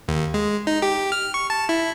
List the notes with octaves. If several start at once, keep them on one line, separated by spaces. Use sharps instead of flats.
D#2
G#3
D#4
G4
F6
C#6
A5
E4